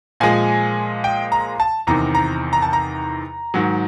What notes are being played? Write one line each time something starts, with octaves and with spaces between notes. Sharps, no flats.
A#2 F3 G#3 G#5
G5
A#5
A5
E2 C3 D#3 A#5
A#5
A#5
A5
A#5
G#2 D#3 F#3